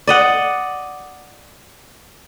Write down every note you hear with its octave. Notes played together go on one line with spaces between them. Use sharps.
D5 D#5 F#5